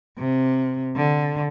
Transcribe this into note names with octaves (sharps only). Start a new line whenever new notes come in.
C3
D3